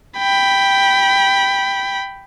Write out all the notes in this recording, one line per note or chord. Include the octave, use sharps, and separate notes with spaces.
G5 B5